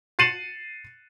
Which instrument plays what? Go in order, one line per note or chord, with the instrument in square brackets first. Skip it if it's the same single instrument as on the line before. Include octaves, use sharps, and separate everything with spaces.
[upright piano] A6 C7 C#7 D#7 E7 F#7